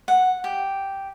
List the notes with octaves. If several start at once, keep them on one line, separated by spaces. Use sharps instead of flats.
F#5
G4